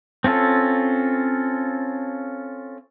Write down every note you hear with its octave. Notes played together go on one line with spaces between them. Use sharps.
C4 C#4 F4 A4